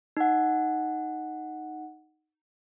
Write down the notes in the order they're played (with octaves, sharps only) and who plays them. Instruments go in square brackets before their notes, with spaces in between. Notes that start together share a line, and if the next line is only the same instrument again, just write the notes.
[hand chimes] D#4 F#5